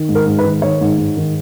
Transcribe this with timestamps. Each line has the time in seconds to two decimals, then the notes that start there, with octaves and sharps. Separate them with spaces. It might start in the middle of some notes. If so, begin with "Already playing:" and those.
Already playing: D#3
0.09 G#2
0.15 A#4
0.26 G#2
0.39 B4
0.44 D#3
0.62 D#3 C#5
0.81 G#2
0.98 G#2
1.17 D#3